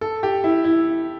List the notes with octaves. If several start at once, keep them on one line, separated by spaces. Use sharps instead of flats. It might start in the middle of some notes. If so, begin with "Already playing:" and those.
A4
G4
E4
E4